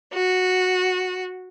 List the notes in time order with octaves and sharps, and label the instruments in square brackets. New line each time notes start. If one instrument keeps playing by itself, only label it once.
[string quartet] F#4